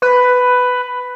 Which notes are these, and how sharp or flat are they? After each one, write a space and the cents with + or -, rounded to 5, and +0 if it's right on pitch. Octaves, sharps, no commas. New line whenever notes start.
B4 +10